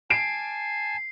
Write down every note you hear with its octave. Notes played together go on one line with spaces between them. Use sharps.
G#5 A5 C7 D7